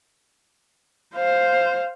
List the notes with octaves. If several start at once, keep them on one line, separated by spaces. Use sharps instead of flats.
C5 F5